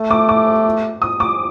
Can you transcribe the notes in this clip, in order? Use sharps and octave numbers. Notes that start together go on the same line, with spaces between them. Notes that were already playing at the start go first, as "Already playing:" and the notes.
Already playing: A3
D6
D6
D#6
D6